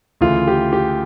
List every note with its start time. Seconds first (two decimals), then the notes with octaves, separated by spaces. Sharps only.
0.21 D2 C#3 E3 F4
0.48 G4
0.73 G4